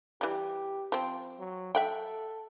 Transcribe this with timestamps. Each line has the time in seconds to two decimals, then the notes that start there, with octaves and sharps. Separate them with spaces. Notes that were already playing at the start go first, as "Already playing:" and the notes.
0.21 E3 G3 G4
0.92 F3 C4
1.39 F#3
1.75 A4 E5 F#5 G5